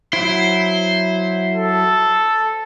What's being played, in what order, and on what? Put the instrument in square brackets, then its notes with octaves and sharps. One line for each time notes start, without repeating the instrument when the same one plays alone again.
[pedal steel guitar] F#3 E4 [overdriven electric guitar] C5
[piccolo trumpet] A4